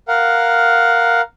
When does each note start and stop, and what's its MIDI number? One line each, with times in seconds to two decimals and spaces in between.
0.08 1.21 70
0.08 1.21 77
0.08 1.21 78